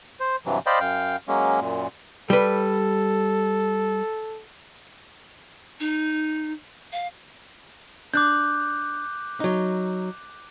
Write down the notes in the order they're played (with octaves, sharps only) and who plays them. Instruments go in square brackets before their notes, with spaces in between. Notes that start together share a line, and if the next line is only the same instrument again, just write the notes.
[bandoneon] C5
G2 C3 E3 F#3
C5 D5 D#5 F5 G5 B5
F#2 F5 G5
F#3 G#3 A#3 C#4
F#2 A#2
[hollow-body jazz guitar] G3 B4 [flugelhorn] A4
[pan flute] D#4
F5
[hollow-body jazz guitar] D4 [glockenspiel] D6 F#6 G6
[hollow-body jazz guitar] F#3 D#4